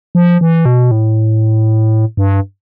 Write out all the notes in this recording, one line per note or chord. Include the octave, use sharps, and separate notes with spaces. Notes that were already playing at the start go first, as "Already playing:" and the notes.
F3
E3
B2
A2
G2